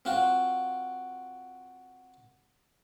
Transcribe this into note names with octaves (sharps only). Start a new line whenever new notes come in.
C4 F4 F#4